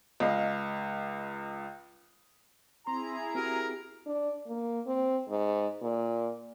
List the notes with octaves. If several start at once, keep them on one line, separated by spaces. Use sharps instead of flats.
C#2 D#5 F5
C4 E4 G#4 A#5 C6
C4 F#4 G4 A#4
D4
A#3
C4
G#2
A#2